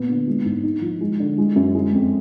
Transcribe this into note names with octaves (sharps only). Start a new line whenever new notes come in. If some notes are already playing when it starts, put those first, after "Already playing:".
Already playing: A#2 B3
D3
G#3
G#2
D#4
F3
G#3
D3
G#3
F#2
G#3
F2